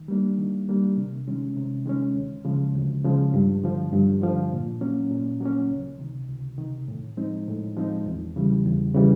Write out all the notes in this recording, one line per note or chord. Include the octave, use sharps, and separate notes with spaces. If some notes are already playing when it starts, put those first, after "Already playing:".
Already playing: D#3
G3 A#3 D4
D#3
G3 A#3 D4
C3
D#3 G#3 C#4
C3
D#3 G#3 C#4
D2
C#3 F3 G#3
D2
C#3 F3 G#3
G2
D3 F3
G2
D3 F3
A#2
F#3 A#3 C#4
A#2
F#3 A#3 C#4
C#2
C3 D#3
C#2
C3 D#3
A2
F3 G#3 C4 D#4
A2
F3 G#3 C4 D#4
E2
C#3 E3 G3
E2
C#3 E3 G3